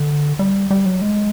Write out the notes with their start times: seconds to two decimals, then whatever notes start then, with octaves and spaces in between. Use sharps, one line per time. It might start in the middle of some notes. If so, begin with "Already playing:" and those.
Already playing: D3
0.39 G3
0.71 G3
0.86 F#3
1.02 G#3